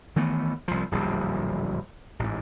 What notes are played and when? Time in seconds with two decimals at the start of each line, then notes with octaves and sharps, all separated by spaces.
0.16 D#3 E3 A3 B3
0.68 C2 F3
0.91 D1 A#1 E2 G3
2.19 A1 G#2